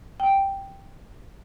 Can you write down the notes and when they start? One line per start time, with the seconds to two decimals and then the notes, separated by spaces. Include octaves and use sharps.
0.20 G5